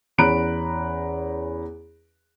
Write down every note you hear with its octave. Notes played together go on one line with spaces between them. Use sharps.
E2 C#4 A#5 B5 F#6 D7